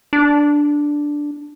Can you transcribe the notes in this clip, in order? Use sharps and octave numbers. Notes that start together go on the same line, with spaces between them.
D4